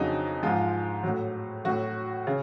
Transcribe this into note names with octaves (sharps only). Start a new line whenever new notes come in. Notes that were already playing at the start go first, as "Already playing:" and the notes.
Already playing: F2 C#3 F#3 D#4
G#2 F3 G#3 F4
A2 F#3
A2 F#3 F#4
C#3